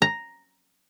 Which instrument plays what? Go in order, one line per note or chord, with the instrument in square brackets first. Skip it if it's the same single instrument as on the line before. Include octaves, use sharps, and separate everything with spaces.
[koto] A#5